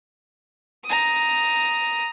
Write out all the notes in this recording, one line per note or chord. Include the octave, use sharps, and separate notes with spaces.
A#5 D#6